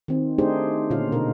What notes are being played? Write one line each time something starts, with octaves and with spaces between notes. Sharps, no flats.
D#3 C4
A3 D4 D#4 G4 G#4 C5
A#2 D3 C#4 F4 F5
B2 A#3 D#4 A#4